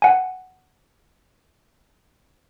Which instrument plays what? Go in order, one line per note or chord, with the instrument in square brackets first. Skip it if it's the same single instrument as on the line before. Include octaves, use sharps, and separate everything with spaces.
[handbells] F#5 G#5